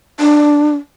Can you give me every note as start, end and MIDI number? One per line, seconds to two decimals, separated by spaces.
0.20 0.75 62